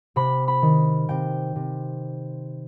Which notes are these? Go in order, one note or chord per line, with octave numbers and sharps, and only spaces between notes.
C3 B5
B5
D#3
C3 G5
C3